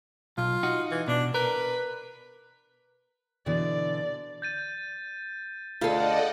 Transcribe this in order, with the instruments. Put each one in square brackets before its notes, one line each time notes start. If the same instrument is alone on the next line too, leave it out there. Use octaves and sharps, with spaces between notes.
[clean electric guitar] B1 [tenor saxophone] F4
[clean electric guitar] D#4 F#4
[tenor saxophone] E3
[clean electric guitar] B2 [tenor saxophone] D4
[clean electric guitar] A#4 [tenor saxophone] B4
[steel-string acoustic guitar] B2 D3 E3 [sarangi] D5
[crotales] G6 A6 D#7
[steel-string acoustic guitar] D2 A4 [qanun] F4 G#4 F5 [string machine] D5 D#5 F#5